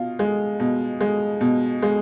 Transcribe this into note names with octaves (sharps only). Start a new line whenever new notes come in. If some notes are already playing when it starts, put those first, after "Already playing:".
Already playing: B2 F4
G#3
B2
G#3
B2
G#3